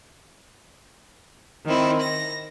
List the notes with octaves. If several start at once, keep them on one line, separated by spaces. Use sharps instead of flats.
D#3 C4 E4
A#6